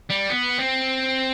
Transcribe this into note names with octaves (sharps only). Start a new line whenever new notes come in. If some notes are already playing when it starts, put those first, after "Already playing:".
G3
B3
C4